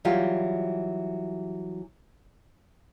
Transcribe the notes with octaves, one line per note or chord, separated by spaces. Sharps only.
E3 F#3 G3 F4 G4